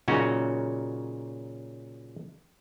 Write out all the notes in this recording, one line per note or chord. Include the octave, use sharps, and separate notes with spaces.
A#2 C#3 F#3 C#4 D#4 F#4